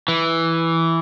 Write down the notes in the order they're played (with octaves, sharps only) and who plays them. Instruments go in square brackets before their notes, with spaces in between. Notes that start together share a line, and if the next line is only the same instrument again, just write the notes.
[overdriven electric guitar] E3